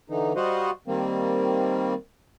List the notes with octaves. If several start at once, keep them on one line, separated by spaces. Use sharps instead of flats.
D3 E3 D#4
G3 F#4 C5 D#5 F5 F#5
D#3 G3 A#3 C4